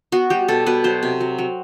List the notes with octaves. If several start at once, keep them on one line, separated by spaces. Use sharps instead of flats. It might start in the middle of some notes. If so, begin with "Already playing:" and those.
B3 F#4
G3 G4
B2 A4
B2 B4
F#3 C5
C3
F#3
F#3